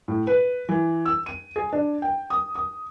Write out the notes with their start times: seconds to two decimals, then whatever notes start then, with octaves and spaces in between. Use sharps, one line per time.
0.08 A2
0.27 B4
0.69 E3
1.05 E6
1.26 D#7
1.56 G#4
1.73 D4
2.02 G5
2.30 D#6
2.55 D#6